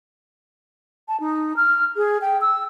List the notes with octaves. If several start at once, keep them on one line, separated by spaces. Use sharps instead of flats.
A5
D#4
F6
G#4
G5
E6